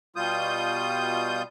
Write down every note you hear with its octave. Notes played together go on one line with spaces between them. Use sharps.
B2 G3 F4 D#6 G6